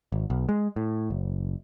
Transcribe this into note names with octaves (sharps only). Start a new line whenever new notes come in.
G#1
B1
G#3
A2
F#1